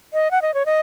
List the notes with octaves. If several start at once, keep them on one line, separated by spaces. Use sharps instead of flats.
D#5
F#5
D#5
C#5
D#5